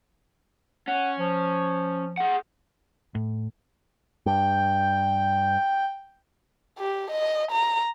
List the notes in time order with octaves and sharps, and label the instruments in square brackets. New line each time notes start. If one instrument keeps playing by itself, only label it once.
[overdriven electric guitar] C#4 [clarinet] F#5
[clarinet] F3
[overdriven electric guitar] G#4 F#5
[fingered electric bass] A2
[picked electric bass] G2 [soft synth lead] G5
[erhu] G4
D#5
A#5